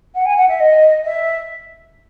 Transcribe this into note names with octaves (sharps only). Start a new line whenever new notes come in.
F#5
G#5
F#5
E5
D#5
E5